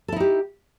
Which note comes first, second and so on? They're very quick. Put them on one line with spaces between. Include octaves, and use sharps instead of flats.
A4 E4 D#4 G4